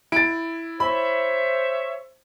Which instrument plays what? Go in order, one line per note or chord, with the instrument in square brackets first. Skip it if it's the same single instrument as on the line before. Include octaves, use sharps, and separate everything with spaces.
[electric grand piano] E4 [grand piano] A6 D7
[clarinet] C5 [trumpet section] C#5 E5 [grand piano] B5